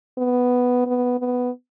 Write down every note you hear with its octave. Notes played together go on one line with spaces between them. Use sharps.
B3
B3
B3